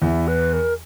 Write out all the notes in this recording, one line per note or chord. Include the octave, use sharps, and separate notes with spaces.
E2 E4
B4
A#4